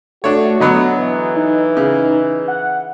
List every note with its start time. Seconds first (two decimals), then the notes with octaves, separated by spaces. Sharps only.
0.24 A3 D4 F#4 C#5
0.60 D3 F#3 B3 D#5
0.97 E3
1.36 D#4
1.77 C#3
2.48 F#5